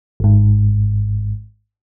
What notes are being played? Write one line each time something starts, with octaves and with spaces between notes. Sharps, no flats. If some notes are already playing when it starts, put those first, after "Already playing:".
G#1 G#2